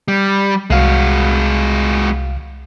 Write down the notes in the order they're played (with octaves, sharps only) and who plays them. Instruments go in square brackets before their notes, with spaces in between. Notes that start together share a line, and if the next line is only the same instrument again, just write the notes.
[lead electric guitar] G3
[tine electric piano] C2 F5 [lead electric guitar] G#3 F#4